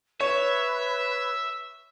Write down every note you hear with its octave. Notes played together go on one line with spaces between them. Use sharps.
B4 C#5 E5